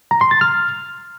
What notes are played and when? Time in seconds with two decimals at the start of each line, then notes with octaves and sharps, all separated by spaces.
0.11 A#5
0.21 C6
0.31 A6
0.41 F6